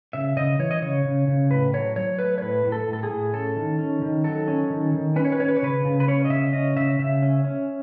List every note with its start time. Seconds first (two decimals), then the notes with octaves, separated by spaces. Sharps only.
0.13 C#3 E5
0.37 C#3 D#5
0.59 E3 C#5
0.71 D#5
0.82 C#3 C#5
1.05 C#3
1.28 C#3
1.51 A2 B4
1.74 F#3 C#5
1.96 F#3 C#5
2.19 A3 B4
2.38 C#5
2.41 A2 B4
2.65 A2
2.72 A4
2.88 A2
2.93 A4
3.03 G#4
3.10 A2
3.33 C#4 A4
3.56 D#3
3.79 C#4
4.02 D#3
4.24 F#3 A4
4.48 C#4
4.70 D#3
4.94 D#3
5.16 C#4 B4
5.25 C#5
5.32 B4
5.39 C#4 C#5
5.48 B4
5.57 C#5
5.62 C#3 B4
5.84 C#3
6.00 B4
6.08 C#4 C#5
6.25 D#5
6.30 C#3 E5
6.53 C#4 D#5
6.76 C#3 E5
6.99 C#3 E5
7.22 C#4
7.45 C#4